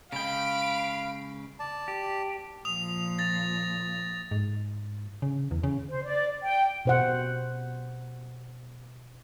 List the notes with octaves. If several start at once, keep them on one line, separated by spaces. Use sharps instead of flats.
C#3 G#3 F5 G5 B5 D7
D5 A5
G4
A#2 F3 D#6 F7
A6 A#6
G#2
C#3
E2
C#3
C5
D5
G5
B2 C5 F#5